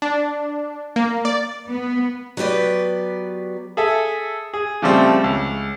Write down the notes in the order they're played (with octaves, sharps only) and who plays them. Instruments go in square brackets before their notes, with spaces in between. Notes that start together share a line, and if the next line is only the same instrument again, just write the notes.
[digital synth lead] D4
A#3
D5
[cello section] B3
[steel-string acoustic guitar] F#3 B3 G4 B4 D5
[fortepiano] G#4 A4 E5
G#4
C#3 F3 G3 A3 C4
C#2